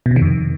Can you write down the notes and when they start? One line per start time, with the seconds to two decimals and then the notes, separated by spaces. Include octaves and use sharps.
0.06 B2
0.11 C3
0.16 D#3
0.22 F2